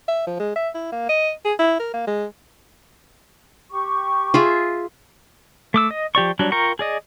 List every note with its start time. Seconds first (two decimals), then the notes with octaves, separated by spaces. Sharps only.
0.08 E5
0.27 F3
0.40 G#3
0.56 E5
0.75 E4
0.92 A#3
1.09 D#5
1.45 G#4
1.59 E4
1.79 A#4
1.94 A#3
2.07 G#3
3.69 G4 C#6
4.34 F4 G#4 E5
5.74 A3 D6 E6
5.91 D#5
6.15 F3 G4 D5 C#6
6.39 F#3 G3 D4 F#4
6.52 F4 A#4 G5 A#5 C#6
6.79 G#4 D5 D#5